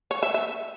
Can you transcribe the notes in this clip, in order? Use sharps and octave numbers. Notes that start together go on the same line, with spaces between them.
C#5
E5
E5